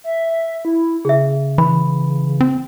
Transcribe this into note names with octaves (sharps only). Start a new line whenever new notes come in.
E5
E4
C#3 G#4 E5
E3 B5
C4